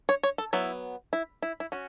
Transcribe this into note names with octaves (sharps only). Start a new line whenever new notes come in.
C#5
C#5
A4
F#3 B3 E4
E4
E4
E4
C#4 F#4